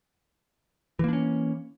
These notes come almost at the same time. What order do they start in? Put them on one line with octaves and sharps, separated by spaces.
E3 A#3 D4 C#4